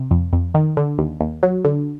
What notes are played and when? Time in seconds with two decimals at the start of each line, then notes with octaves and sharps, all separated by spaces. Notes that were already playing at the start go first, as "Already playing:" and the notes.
Already playing: C3
0.11 F2
0.33 F2
0.54 D#3
0.77 D3
0.98 D#2
1.20 D#2
1.43 F#3
1.65 D3